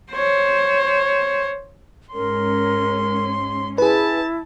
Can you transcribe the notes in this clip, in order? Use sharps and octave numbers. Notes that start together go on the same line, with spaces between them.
C5 C#5
G#2 C#4 A#4 C6
E4 G#4 B4 A5